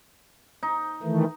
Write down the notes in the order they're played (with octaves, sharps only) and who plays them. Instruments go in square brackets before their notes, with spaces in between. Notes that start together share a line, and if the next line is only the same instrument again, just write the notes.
[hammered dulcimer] D#4
[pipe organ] D#3 E3 A3